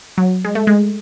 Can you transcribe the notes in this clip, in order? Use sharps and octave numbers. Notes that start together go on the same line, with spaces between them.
F#3
G#3
A3
G#3